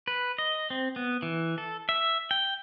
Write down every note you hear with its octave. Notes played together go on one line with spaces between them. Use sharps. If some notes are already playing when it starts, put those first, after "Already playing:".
B4
D#5
C4
B3
E3
A4
E5
G5